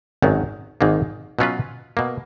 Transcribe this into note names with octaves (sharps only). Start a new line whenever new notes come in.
G#1 F#2 D#3 F#3
G#1 G#2 D#3 A#3
B2 F#3 C#4 F4 B4
B2 A#3